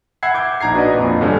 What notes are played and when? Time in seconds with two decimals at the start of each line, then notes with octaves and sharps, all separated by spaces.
0.23 E5 F#5 B5 E6 G#6 C7
0.34 D6 G6 G#6 D7
0.61 A#1 D#4 A#5 G#6 C7
0.74 D4 F#4 B4 D5 D#5
0.94 F2 A#2
1.20 A1 G2 D3 C#4 A4